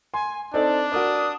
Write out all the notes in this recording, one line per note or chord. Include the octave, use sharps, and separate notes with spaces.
G#5 C6
C4 D4 D#4 A4 D5
F#4 A#4 D5 D#6